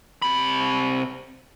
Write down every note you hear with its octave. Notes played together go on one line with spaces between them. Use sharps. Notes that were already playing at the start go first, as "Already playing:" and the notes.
C3 B5